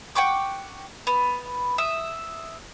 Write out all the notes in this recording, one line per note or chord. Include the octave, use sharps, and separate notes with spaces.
F#5 G5 C#6 D6
B3
E5 D#6